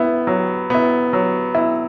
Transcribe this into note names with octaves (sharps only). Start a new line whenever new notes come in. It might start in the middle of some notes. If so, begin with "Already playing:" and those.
Already playing: B3 E4
F#3
B3 E4
F#3
B3 E4